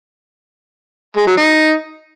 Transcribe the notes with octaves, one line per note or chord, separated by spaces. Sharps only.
G#3
F#3
D#4